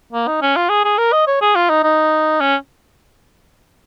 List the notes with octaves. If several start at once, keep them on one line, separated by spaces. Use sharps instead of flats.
A#3
D#4
C#4
F4
G#4
G#4
A#4
D#5
C#5
G#4
F4
D#4
D#4
C#4